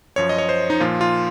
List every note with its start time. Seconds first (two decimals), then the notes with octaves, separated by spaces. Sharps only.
0.16 F#2 F3 C#5
0.29 D#5
0.38 C#5
0.49 C5
0.70 D#4
0.80 A#2 F3 F4
1.01 F4